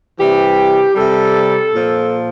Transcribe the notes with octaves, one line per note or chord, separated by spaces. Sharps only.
C3 E3 G3 G4
C3 G3 A4
A#2 F3